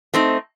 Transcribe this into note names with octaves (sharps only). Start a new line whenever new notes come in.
A3 C4 D#4